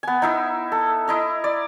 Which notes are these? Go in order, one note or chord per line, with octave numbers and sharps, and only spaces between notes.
B3 G#5
D#4 E4 E5
A4
E4 D#5 A#5
D5